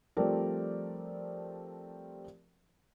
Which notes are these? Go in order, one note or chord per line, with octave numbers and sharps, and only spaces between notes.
F3 G3 A3 C4 A#4 D5